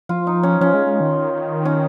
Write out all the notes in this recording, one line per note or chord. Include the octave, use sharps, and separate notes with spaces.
F3 F4
D#4
C#4
F3 C#4
G#3
G#3
D#3
C#4